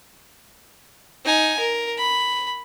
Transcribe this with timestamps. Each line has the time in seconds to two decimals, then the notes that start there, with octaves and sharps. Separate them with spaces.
1.25 D#4 G#5
1.59 A#4
1.98 B5